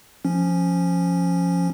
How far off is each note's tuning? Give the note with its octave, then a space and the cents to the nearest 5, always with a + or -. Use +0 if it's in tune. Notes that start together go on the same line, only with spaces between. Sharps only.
F3 +0 C#4 +0